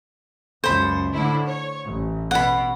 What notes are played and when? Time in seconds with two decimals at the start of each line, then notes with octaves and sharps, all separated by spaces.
0.64 C#2 F#2 C5 B5
1.13 A2 D3 E4
1.46 C#5
1.86 A1
2.31 B2 F#5 B5